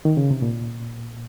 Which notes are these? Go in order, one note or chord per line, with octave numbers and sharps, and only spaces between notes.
D#3
C#3
C3
A#2